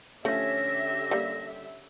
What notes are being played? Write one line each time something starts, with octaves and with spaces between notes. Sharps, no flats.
D3 F3 A3 C#4 G4 E5 A#6
G3 A#3